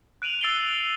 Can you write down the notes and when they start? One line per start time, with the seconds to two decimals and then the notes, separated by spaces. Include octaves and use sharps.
0.22 F#6 D7 D#7 F7 F#7
0.41 E6 A6 C7 D7 F#7 G7